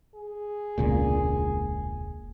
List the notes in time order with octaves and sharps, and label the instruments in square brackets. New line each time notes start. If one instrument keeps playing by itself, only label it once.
[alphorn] G#4
[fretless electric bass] E1 C#2 A#2